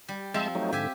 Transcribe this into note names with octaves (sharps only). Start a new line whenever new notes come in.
G3
F3 G#3 C4 E5 A5
F#3 A3 D#4
G#2 D3 G4 E5 G#5